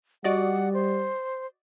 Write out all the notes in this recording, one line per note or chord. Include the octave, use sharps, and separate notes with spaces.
G3 F#4 D5 D#5 F#5
C5